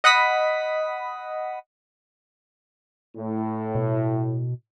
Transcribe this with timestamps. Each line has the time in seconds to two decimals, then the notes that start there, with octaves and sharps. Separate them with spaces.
0.04 D#5 F#5 B5 D#6 B6
3.15 A2
3.75 B2